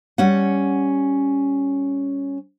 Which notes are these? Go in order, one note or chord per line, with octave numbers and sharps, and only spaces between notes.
G3 C#4 F#5